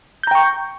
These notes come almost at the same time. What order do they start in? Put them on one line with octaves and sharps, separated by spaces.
G6 A#5 G5 C#6